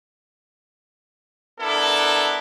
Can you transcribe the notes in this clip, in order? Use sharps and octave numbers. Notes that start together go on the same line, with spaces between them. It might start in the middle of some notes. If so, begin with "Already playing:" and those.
B3 D4 E4 A4 A#4